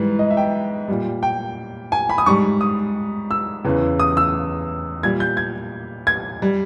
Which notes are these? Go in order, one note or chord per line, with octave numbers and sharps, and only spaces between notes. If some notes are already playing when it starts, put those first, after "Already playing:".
Already playing: G#2 E3 G3
D#5
E5
G5
A#2 G3
G5
G#5
B5
D#6
G#2 G3 C#6
D#6
E6
E2 C#3 E3
D#6
E6
A#2 G3 G#6
G6
G#6
G#6
G3